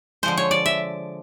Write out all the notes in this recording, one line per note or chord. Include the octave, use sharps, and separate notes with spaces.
D3 F3 G#3 C5
C#5
D5
E5